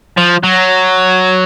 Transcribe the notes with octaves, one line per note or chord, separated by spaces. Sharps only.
F3
F#3